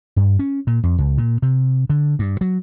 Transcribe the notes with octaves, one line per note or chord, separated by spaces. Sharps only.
G2
C#4
A#2
F2
C#2
A#2
C3
D3
G2
F#3